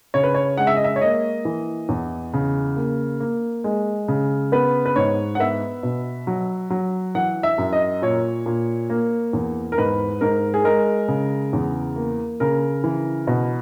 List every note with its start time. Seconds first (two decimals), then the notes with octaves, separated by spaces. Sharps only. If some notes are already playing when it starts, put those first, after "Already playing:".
0.14 C#3 C#5
0.23 B4
0.34 C#5
0.58 G#3 F#5
0.67 E5
0.76 D#5
0.84 E5
0.96 C#5
1.01 A#3 D#5
1.45 E3
1.89 E2
2.33 C#3
2.76 A#3
3.20 A#3
3.64 G#3
4.08 C#3
4.52 B3 B4
4.86 B4
4.96 G#2 C#5
5.35 F#5
5.39 B3 E5
5.83 B2
6.27 F#3
6.70 F#3
7.15 E3 F#5
7.43 E5
7.58 F#2
7.73 D#5
8.02 A#2 C#5
8.46 A#2
8.90 A#3
9.33 E2
9.72 A#4
9.78 G#2 B4
10.21 G#2 A#4
10.54 G#4
10.64 G#3 A#4
11.08 C#3
11.53 E2
11.96 A#3
12.40 C#3 A#4
12.84 E3
13.27 B2